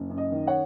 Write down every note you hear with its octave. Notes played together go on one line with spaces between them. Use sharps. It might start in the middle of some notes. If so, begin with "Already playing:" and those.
Already playing: F#1
F#2
D#5
D#3
C#5 F#5